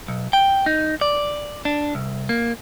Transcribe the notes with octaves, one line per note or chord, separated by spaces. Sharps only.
B1
G5
D#4
D5
D4
C2
A#3